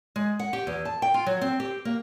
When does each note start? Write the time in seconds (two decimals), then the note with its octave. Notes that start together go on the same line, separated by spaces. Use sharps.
0.16 G#3
0.39 F#5
0.53 G4
0.67 E2
0.85 A5
1.02 G5
1.14 F4
1.26 F#3
1.41 C4
1.60 G4
1.85 A#3